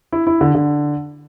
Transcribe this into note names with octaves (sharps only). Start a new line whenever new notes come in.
E4
E4
D3
D3